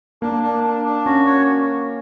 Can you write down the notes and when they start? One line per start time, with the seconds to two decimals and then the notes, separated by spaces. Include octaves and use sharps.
0.22 A#3 D4
0.43 D4
0.64 D4
0.85 D4
1.06 C#4 F#4
1.26 C#5